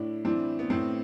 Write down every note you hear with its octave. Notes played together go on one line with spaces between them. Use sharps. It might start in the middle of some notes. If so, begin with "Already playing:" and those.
Already playing: A2 D4 E4
E3 C4 D4
B3
A2 C4